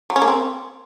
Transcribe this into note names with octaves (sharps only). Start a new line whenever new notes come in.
F#3
C#4
A#3
C4